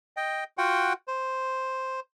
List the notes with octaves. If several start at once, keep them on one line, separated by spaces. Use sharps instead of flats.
D#5 G5
F4 F#4 F#5 G5
C5